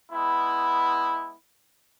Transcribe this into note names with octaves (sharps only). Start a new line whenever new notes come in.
G#3 B3 E4